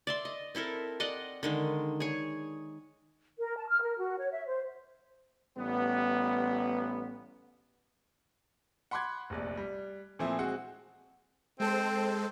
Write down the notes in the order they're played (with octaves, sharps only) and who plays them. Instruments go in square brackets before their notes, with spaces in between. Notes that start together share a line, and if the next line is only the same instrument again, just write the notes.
[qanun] D5 E5 C6
D#5
C4 E4 A4 A#4
D5 D#5 F#5 C6
D3 D#3 G#3
G#4 C#5
[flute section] A#4
A5
F6
A#4
F#4
C#5
E5
C5
[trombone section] A1 G3 B3
[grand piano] F#5 B5 C6 D6 F#6 G#6
F1 A#1 D5
G3
A#2 E3 F3 A3 C4 E4
G#3 C4 F#4 F#5
[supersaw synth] G#3 A4 C5 [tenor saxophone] C4